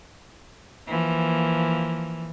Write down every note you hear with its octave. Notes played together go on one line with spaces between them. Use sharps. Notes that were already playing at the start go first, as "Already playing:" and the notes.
E3 F3 A#3